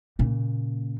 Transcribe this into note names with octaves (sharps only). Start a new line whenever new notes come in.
A#2 C#3